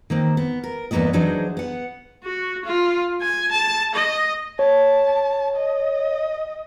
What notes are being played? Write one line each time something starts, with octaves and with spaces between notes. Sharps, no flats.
D#3 A#3 C4
B3
A#4
E2 G2 B2 A#3 B3 D#5
E3 F#3 D4 D#4 G#4 C5
B3 F#5
F#4
F4
G#5
A5
D#5
C#5 A5
D#5